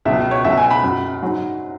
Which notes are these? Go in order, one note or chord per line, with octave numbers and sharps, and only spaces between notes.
C#2 B2 F#3 E5
C#5
C#2 B2 F#3 E5
G#5
B5
F#2 F#3
G#2 F#3